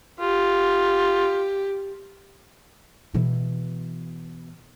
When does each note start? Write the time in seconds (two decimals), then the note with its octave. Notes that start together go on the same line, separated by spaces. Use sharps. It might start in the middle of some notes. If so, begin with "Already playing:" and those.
0.20 F4 G4
3.14 B2 E3